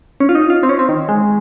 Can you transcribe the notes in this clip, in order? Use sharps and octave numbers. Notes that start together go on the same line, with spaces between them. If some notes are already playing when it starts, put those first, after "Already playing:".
C#4
F4
D#4
F4
C4
C#4
C4
D#3
G#3